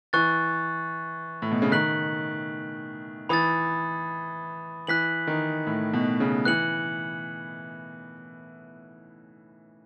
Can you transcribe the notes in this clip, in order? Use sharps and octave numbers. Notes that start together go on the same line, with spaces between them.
E3 C#6 F#6 A6
A2
B2
C#3
D#3 F#6 B6 F#7
E3 B5 D#6 A6
E3 F#6 B6 F#7
D#3
A2
B2
C#3
E3 F#6 C#7 F#7